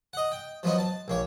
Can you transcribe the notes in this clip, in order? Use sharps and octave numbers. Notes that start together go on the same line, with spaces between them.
D#5 F#5
G5
F3 F#3 B3 D#4
A5
A#1 A#3 C#5